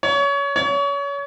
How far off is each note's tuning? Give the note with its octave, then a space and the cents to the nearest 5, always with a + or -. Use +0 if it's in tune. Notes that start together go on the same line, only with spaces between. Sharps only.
C#5 +25
C#5 +30